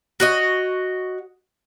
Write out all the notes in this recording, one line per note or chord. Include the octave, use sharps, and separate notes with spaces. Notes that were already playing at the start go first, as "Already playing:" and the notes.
F#4 C#5 D#5